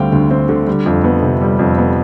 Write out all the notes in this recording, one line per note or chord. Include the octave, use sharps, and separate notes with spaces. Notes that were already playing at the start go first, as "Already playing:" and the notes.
Already playing: D2 D3 G3 C4 F5 G5
D2
C4
D3
G3
F2
B3
C3
G3
F2
B3